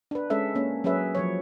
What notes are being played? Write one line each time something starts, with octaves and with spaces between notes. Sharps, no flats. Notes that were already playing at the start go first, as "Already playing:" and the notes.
D4 B4
G#3 C#4 A4 E5
A#3 C#4
F#3 C#4 G#4 B4 E5
F3 F#3 C#5